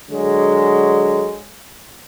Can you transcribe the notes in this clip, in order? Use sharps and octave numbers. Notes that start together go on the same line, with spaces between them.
D3 F#3 G#3